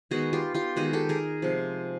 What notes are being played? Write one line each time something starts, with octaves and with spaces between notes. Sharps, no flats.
D#3 G#3 B3 D#4 F#4 G#4
F4 G4
F4 G4
D#3 G#3 B3 D#4 F#4 G#4
G4 A4
G#4 A#4
C3 F3 G#3